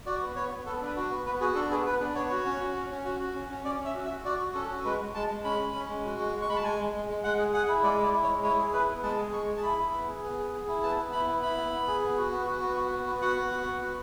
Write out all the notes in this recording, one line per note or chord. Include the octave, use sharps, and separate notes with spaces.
F#4 D5
B3
B3 C#5
B3
B3 A4
D4 B4
F#4
B3
B3 B4
F#4 G#4
D4 A4
B3 G#4
B3 B4
D4
B3 C#5
F#4
C#4
F#4
C#4
C#4
F#4
F#4
C#4
C#4
C#4 D5
C#4
E5
F#4
E5
F#4
F#4 D5
F#4
C#4 A4
F#4
G#3 B4
G#3
G#3 A5
G#3
C#4 B5
C#4
C#4
G#3
F#4
G#3
G#3
C#6
G#3 B5
A5
G#3 G#5
G#3
G#3
G#3
G#3 F#5
G#4
G#4 F#5
E4
G#3 D5
E4 D5
E4
C#5
G#3
E4 C#5
G#4
E4 B4
B3
G#3 A5
G#4
G#3 C#6
G#4
A5
E4 B5
E4
B3
G#4
B3
G#4
G#4
E4
B3 A5
B3
E4 B5
B3
E4 B5
B3
B3
G#4
B3
F#4
B3
F#4
B3
F#4
B3
B3
F#4 F#5
B3
F#4
B3
F#4